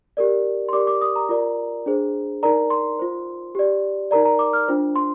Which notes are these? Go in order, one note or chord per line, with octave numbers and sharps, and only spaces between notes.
G4 A#4 D5
C6
G4 A#4 D5 D6
D6
D#6
A#5
F4 A#4 D5
D4 G#4 C5
D#4 A#4 D5 A#5
C6
F4 C5
G4 D5
D#4 A#4 D5 A#5
A#5
D6
F6
D4 F4 C5
C6